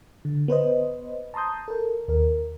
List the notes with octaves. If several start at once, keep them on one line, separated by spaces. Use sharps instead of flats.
D3
B3 B4 C5 D#5
A5 A#5 C6 D#6 G6
A4 A#4
D#2 A#4